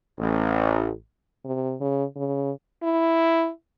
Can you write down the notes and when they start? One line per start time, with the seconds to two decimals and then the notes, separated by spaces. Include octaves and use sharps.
0.19 A1
1.45 C3
1.80 C#3
2.16 C#3
2.83 E4